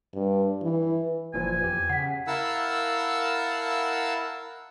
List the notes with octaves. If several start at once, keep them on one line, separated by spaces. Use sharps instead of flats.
G2
E3
F#1 A#2 E3 F3 G#5
E2 G4
C#3 F#5 B6
E4 A#4 F5 F#5 A5 E6